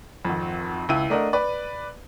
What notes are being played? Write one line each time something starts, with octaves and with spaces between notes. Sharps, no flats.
G#1 F2
C#2 E4 D#7
A3 D4 A#4 D#5 F#5
B4 D5